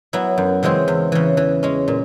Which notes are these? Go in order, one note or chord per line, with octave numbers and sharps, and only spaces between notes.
F#3 B3 E4
F#2
C#3 E3 G#3 C4
E2
C#3 E3
E3
G#3 C#4
A#2